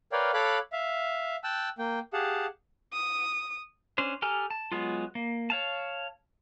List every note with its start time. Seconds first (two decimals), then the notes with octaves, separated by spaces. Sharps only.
0.12 A#4 B4 C#5 D5 F5 G5
0.34 A4 C#5 F5 B5 D6 F#6
0.72 E5 F5
1.44 G5 A5 E6 F#6
1.78 A#3 G5
2.13 G4 G#4 F5 F#5 A5
2.93 D#6
3.98 C#4 D4 C5
4.22 G4 A4 G#5 A#5 F6
4.50 A5
4.72 F#3 G#3 B3 F4
5.15 A#3
5.50 C#5 F5 A5